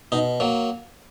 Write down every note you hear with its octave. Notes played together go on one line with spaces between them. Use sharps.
B2 D#4
F#3 A#3